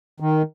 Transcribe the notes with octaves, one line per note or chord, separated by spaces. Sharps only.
D#3